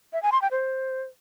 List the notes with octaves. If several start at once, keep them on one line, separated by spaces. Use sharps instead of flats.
E5
G#5
C6
G5
C5